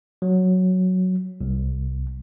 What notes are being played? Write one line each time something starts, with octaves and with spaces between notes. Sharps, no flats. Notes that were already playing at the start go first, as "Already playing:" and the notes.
F#3
C2